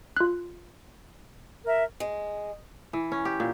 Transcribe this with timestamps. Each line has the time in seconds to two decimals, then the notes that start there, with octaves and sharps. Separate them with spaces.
0.17 F4 F#6
1.65 A#4 E5
2.00 G#3
2.93 E3
3.12 C#4
3.25 G4
3.40 A#2